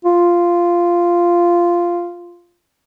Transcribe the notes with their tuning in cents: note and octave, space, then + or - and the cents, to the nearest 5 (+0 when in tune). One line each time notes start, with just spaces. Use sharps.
F4 -10